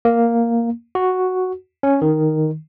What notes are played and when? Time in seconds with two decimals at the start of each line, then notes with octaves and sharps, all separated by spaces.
0.05 A#3
0.95 F#4
1.83 C#4
2.02 D#3